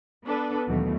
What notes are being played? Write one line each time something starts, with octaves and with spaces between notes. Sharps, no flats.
B3 D4 A4 B4
D#2 B2 E3 F#3 A3